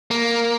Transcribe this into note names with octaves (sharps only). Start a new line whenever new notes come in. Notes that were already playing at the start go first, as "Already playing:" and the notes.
A#3